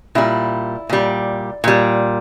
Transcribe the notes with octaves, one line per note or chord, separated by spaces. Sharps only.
A#2 G3 E4
A#2 G3
A#2 G3